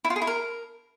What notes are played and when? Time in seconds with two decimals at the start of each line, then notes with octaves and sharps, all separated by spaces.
0.04 E4
0.10 F4
0.16 G#4
0.22 E4
0.27 A#4